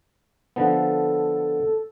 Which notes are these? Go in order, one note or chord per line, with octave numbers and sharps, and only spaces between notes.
D3 F3 B3 A4